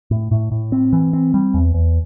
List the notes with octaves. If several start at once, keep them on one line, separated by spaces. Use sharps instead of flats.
A2
A2
A2
C4
E3
C4
G3
E2
E2